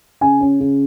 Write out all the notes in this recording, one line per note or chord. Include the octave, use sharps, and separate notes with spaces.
C#3 G#5
C#4
C#3